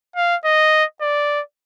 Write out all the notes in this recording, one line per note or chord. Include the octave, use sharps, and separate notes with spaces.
F5
D#5
D5